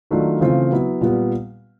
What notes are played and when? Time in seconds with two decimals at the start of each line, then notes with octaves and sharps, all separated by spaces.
0.11 D#3 F#3 A3 D4 F4
0.41 C#3 E3 A3 C4 F4
0.71 F#3 B3 E4
1.01 A#2 G3 B3